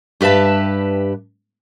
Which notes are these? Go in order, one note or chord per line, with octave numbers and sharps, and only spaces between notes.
G2 G4 B4 E5 A5